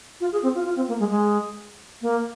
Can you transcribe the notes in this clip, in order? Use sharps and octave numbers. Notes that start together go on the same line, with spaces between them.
F4
G#4
C4
F4
F4
C4
A#3
G#3
G#3
A#3